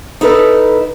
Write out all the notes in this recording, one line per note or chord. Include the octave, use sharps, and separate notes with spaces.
D#4 E4 A4 B4